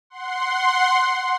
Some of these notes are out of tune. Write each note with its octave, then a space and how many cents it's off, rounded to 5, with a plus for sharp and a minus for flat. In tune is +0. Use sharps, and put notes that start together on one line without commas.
F#5 +0 C6 +0